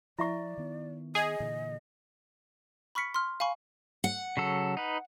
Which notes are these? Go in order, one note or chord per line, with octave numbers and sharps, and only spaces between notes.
F3 E4 D5 E5 C#6
D#3 B3
G#4 D#5
A#2 D3 E3
B5 C#6 F6 B6 C#7
C6 F6
F5 G#5 B5 C#6
F#5
C#3 F#3 A4
D#4 B4